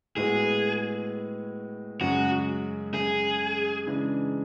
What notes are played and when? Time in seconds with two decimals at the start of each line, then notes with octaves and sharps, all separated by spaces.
0.16 A2 G#3 B3 F#4 G#4
2.01 F#2 C#3 G#3 F#4
2.94 G#4
3.87 C#3 E3 G#3 D4